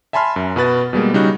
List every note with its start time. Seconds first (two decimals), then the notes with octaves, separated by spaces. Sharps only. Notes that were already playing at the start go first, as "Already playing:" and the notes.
0.13 E5 G#5 A5 B5 C6 F6
0.36 F#2
0.56 B2 F#4 B4 A6
0.93 B2 G3 G#3 A#3
1.14 C#3 G3 D#4 F#4 F#6